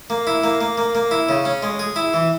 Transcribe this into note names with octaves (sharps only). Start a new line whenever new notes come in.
A#3
E4
A#3
A#3
A#3
A#3
E4
C#3
C#4
G#3
G#4
E4
E3